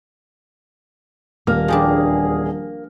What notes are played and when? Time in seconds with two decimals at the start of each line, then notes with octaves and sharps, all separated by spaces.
1.47 D#1 A#3 F6
1.68 E2 F3 G3 D4 G#4